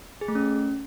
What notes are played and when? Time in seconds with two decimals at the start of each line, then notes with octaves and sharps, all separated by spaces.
0.21 G#4
0.28 A3
0.35 C#4